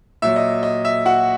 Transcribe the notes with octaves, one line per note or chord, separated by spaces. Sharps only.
A#2 F#3 E5
D#5
D#5
E5
F#4 F#5